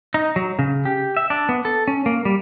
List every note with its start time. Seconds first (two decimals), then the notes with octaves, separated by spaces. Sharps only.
0.14 D#4
0.36 F#3
0.59 C#3
0.85 G4
1.17 E5
1.30 D4
1.49 B3
1.65 A4
1.88 C#4
2.06 A#3
2.25 G3